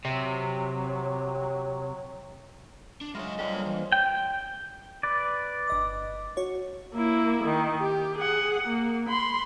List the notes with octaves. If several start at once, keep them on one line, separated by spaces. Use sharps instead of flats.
C3 F#3
D4
F#3 G#3 F4 G#4 C#5 D#5 E5 B5
G#2 D3 G3 A4 C#5 F5 C6
A#3 G#4
E3 C5
G5
B4 D5
G1 D#5 D6
F#4 C#5
A#3 E4
D#3
G4
G#4 F#5
A#3
B5 C6